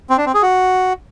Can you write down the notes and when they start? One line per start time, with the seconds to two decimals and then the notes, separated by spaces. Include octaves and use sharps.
0.10 C4
0.18 D4
0.26 C4
0.34 G#4
0.42 F#4